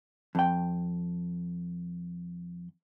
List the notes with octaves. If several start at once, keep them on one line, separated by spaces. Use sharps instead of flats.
F2 G5